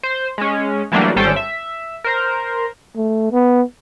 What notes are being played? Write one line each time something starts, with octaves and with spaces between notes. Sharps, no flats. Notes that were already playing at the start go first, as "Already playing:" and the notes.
C5
G#3 C#4
E3 F#3 G3 A3 A#3 D4
G#1 G3 C#4 A4 C5 G5
E5
A#4 C5 A#5
A3
B3